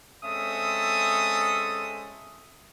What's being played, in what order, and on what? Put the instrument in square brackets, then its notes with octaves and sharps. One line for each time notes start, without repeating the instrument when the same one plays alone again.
[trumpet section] G#3 C4 C#4 A4 E5 D#6